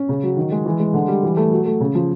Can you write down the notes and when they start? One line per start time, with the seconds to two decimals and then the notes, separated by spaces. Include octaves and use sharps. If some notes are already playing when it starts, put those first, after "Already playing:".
Already playing: C#4
0.09 C#3
0.23 F#3
0.37 D#3
0.51 G#3
0.66 E3
0.79 G#3
0.94 D3
1.08 G3
1.23 E3
1.37 A3
1.51 F#3
1.65 A3
1.81 C#3
1.95 F3